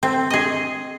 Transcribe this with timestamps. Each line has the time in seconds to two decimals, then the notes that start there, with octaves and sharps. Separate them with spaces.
0.03 C4
0.30 G#4 D#5